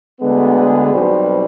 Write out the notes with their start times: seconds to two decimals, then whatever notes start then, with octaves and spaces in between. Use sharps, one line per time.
0.21 D2 D3 G#3 B3
0.58 G#4
0.94 B1 B2 G3 C4 C5